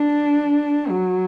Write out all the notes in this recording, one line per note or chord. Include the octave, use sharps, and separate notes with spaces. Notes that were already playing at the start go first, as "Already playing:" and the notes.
Already playing: D4
F#3